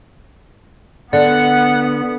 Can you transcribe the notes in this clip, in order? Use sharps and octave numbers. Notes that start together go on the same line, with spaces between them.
D3 B3 D5 F#5